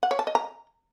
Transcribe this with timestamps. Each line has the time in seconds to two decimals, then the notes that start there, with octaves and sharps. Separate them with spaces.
0.03 F#5
0.11 C#5
0.19 A5
0.27 D#5
0.35 A#5